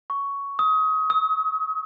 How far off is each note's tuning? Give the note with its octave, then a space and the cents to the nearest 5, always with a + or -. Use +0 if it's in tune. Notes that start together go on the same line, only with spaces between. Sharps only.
C#6 +10
D#6 +30
D#6 +45